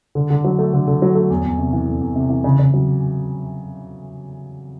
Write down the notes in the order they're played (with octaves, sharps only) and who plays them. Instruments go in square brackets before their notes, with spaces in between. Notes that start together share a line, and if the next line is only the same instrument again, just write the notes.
[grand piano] D3
D3
F#3
A3
D3
D3
F#3
A3
E2
E2
C3
E3
E2
E2
C3
E3
C#3
C#3
F#3